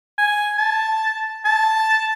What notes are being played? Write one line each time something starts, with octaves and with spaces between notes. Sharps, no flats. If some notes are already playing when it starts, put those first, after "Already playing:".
G#5
A5
A5